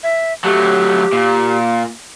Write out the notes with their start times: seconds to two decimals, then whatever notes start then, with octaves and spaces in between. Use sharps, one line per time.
0.03 E5
0.44 F#3 A3 G4
1.13 A#2